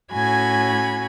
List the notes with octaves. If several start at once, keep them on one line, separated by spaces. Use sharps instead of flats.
A2 C#4 F#4 G#5 B5 G#6